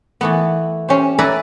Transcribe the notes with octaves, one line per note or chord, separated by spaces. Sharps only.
E3 A3 B3
C#4 G4 C5
A4 B4 D5 E5 G#5 A#5